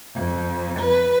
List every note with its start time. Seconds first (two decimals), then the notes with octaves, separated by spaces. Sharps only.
0.15 F2
0.80 B4